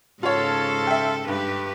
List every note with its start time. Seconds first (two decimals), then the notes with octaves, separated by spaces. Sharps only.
0.23 G#2 C#3 F4 A4 C#5 F5 A5 C6
0.87 E5 G5
1.28 G2 G4 B4